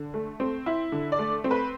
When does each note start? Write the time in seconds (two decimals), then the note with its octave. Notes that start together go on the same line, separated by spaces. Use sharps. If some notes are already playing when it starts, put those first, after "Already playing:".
Already playing: D3
0.14 A3
0.40 C4
0.66 E4
0.92 D3
1.12 D5
1.19 A3
1.44 C4
1.51 B4